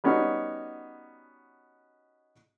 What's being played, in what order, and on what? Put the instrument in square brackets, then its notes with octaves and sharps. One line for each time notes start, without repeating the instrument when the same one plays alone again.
[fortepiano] G3 B3 C#4 D#4 F#4